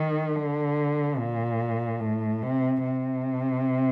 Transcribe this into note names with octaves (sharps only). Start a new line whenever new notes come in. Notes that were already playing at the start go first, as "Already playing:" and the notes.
Already playing: D#3
D3
A#2
A2
C3
C3